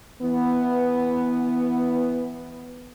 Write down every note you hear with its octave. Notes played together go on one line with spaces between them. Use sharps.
E3 B3